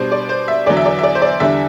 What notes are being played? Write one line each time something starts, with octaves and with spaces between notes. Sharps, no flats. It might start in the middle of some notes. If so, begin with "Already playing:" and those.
Already playing: B2 G3 D4 C5
D5
C5
E5
E2 D3 F#3 D5
E5
D5
E5
D5
C5
D5
E2 D3 G3 D4 E5